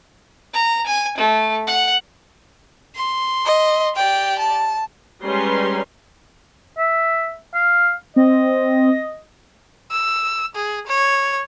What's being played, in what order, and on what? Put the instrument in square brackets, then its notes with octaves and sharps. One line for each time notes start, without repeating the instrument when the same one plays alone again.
[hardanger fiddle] A#5
G#5
A3
F#5
[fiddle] C6
[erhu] D#5
[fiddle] G4 D5 [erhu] G5
[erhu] A5
[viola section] G3 G#3 C#4 B4 A#5 C6
[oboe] E5
F5
[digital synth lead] C4 [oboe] D#5
[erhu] E6
G#4
C#5